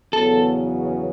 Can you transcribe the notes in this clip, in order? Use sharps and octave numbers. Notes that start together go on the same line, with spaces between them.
E2 C#3 F#3 B3 A4